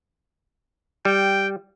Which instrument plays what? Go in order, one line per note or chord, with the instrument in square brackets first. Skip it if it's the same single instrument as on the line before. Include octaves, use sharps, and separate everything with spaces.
[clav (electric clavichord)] G3 [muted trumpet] G5